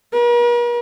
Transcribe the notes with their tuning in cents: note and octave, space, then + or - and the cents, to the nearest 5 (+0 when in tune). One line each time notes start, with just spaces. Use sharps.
A#4 +45